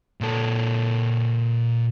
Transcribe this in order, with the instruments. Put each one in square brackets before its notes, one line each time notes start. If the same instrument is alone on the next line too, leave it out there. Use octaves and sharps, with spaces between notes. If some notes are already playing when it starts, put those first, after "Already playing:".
[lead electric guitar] A#2 A4